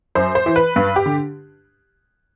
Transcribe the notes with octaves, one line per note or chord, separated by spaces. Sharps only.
F#2 C5
C5
E3
B4
G2 B4
G4
D3